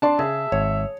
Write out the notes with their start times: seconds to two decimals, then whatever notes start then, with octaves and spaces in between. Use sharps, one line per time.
0.02 D4 D5 A5 C6
0.19 C#3 G#4 E5
0.52 G#1 C#5